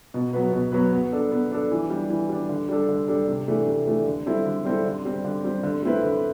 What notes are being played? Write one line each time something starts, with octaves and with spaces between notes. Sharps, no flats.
B2
F#3 B3 F#4 B4
B2
F#3 B3 F#4 B4
B3
D4 A4
B3
D4 A4
E3
G3 D4
E3
G3 D4
D3
G3 D4 A4
D3
G3 D4 A4
C3
E3 A3 D4
C3
E3 A3 D4
D3
G3 C4 E4 A4
D3
G3 C4 E4 A4
D3
G3 C4
D3
G3 C4
D3
A3 C4 E4 B4
D3